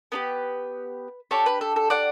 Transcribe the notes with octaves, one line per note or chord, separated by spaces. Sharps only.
B3 D4 G4 B4
D4 G4 A4 C#5
B4
A4
A4
D5 F#5